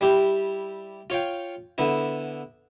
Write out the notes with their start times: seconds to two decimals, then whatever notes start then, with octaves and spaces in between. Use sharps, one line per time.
0.01 G3 E4 G4
1.10 F4 C#5 F5 G5
1.78 D3 B3 E4